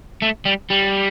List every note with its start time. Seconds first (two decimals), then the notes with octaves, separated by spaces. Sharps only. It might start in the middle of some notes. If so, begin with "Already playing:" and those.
0.22 A3
0.45 G3
0.70 G3